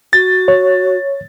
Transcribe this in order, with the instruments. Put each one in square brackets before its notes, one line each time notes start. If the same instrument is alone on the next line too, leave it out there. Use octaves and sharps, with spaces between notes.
[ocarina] F#4 [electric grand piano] A6
[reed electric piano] C#5